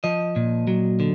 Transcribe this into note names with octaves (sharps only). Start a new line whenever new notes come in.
F3 D#5
A#2
F#3
D3